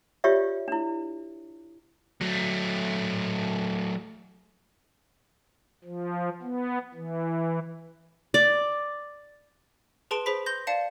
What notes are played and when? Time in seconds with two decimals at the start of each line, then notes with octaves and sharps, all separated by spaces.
0.24 F4 G4 C#5 D5 E5
0.68 D4 E4
2.21 F#3 A3
5.84 F3
6.42 B3
6.94 E3
8.34 D5
10.11 G#4 B4 A5 C6 D7
10.26 G#4 C5 B5 B6
10.46 C6 G6 A#6
10.67 D5 F5 A5 C#7 E7